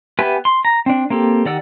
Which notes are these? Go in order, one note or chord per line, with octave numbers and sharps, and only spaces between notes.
B3 G4 B4 E5 G#5
C6
A#5
C4 D4
A#3 C4 G4 A4
D#3 G4 D5 F#5 E6